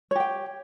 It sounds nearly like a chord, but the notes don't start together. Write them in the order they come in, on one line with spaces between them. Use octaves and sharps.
C#5 G4 G5